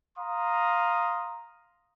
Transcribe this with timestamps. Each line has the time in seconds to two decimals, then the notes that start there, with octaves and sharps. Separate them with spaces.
0.17 F5 A#5 C6 D#6